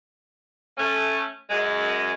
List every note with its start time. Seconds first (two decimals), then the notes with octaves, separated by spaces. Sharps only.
0.78 A3 C#4
1.49 F#2 G#3